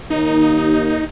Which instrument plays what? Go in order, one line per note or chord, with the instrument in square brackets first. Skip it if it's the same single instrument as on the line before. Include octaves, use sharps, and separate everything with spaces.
[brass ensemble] D#2 [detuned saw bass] D#4